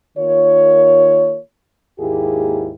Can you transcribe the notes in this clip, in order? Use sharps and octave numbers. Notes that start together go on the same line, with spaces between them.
D#3 A#3 F4 C#5
D#2 G#2 A#3 E4 G4 G#4